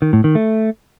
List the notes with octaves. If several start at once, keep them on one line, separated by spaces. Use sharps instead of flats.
D#3
A2
D#3
A3